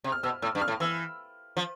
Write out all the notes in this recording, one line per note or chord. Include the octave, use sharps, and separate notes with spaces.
C3
F6
B2 E6
A2 E6
G2
F6
A2
E3 E6
F3